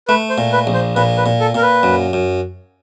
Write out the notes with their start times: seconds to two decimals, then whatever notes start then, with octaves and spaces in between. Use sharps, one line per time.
0.08 A3 B4
0.30 C5
0.38 A#2
0.52 B4
0.67 A#1
0.74 C5
0.96 A#2 B4
1.17 B4
1.26 A#2
1.40 A4
1.55 A#2 A#4
1.62 B4
1.83 F#2
2.13 F#2